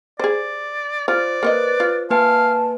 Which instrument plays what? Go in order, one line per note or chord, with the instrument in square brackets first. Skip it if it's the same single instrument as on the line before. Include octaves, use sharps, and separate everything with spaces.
[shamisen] G#4 C5 [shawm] D5
[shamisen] F4 [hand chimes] C5 [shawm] D5
[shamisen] A#3 C#5 D#5 [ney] B4
[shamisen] F4
[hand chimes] A#3 B4 G#5 [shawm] F5 [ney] A5